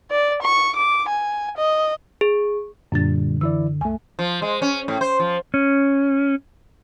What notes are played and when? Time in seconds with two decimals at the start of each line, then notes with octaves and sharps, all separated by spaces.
0.11 D5
0.42 C#6
0.76 D6
1.08 G#5
1.57 D#5
2.21 G#4
2.92 F#2 A#2 D3 G3 D4 A6
3.41 E3 E4 D5 E6
3.81 C2 A3 G#5
4.19 F3
4.42 G#3
4.62 C#4
4.88 A2
5.01 C5
5.20 F3
5.54 C#4